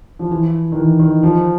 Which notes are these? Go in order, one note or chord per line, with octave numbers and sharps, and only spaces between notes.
F3
E3
D#3
E3
D#3
F3